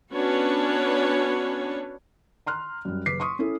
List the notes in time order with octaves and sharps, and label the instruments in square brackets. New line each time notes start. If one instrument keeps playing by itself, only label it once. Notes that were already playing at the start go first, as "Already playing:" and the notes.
[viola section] B3 C#4 D4 F#4 B4 C#5
[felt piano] A#5 C6 F6 F#6
F#2 G3
F#1 B4 D6 B6 C7
C6 C#6 D#6
C#4 E4 A4